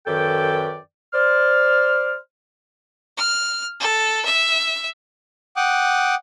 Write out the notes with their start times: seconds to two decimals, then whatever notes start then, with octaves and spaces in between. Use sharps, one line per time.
0.07 F#2 D#3 A4 B4 D5 G5
1.14 C5 D5 F6
3.18 F6
3.80 A4
4.25 E5
5.56 F#5 G5 D6 D#6 F#6